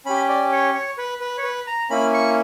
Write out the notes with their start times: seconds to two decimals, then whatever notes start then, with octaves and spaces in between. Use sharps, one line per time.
0.06 C#4 G4 B5
0.29 D5
0.52 C#5
0.74 C#5
0.98 B4
1.21 B4
1.38 C#5
1.44 B4
1.67 A#5
1.90 A#3 C#4 E4 B5
2.14 C#6